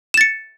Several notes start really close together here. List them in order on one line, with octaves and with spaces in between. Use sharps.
E7 A6 C#7